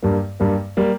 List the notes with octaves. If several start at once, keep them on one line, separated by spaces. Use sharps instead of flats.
G2 G3 A#3
G2 G3 A#3
G3 A#3